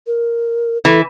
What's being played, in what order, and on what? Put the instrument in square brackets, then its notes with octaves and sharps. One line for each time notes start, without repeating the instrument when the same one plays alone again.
[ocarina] A#4
[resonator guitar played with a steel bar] E3 [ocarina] A4